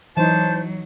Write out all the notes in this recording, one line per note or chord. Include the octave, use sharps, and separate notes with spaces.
E3 F#3 D#4 C5 A5